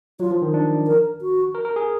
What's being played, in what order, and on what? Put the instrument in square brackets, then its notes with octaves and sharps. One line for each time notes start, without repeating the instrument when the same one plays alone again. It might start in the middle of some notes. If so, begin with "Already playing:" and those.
[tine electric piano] F#3 [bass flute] F4
[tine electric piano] F3
D#3
D4
[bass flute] A#4
F#4
[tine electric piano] A#4
A#4
G#4